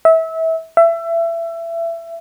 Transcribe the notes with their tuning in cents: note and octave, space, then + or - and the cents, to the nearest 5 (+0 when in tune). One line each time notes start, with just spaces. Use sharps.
E5 -25
E5 +25